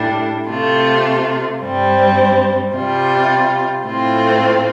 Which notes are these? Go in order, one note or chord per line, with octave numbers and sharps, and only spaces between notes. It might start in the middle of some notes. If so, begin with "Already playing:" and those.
Already playing: A2 G3 D4
C3 A3 F4
G2 G3 C4
C3 G3 F4
A2 A3 C4 F4